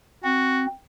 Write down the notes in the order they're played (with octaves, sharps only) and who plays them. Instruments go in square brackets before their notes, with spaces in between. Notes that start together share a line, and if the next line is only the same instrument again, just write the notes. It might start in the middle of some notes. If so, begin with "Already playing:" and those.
[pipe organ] C4 [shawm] F#4